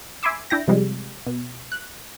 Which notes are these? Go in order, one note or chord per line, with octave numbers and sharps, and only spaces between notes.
E5 G#5 B5 C6 D6 E6
D4 E4 G5 A#6
C3 F3 G3 G#3
B2
F#6